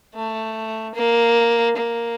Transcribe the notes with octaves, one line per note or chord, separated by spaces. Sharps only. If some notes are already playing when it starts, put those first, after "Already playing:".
A3
A#3
A#3